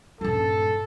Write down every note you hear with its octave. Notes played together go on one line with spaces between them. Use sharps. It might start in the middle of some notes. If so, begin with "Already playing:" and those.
D#1 G2 A4